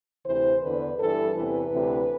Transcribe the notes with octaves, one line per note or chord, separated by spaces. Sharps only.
D2 C3 E3 C5
E2 D3 B4
G2 E3 A4
E2 C3 E3 B4
D2 C3 E3